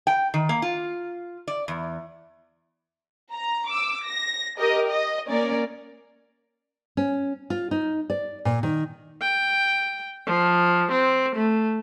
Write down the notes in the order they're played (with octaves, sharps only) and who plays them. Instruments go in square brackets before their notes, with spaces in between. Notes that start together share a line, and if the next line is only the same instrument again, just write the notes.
[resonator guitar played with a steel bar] G5
D#3
A#3
F4
D5
E2
[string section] A#5
D6 E6
A#6
G4 A#4 D#5
D#5
A#3 C#4 A#4 D5
[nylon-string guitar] C#4
F4
D#4
D5
A#2
D#3
[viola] G5
F3
C4
A3